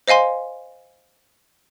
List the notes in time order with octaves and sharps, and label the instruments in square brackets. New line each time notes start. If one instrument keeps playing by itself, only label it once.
[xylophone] C5 D#5 F5 G#5 C6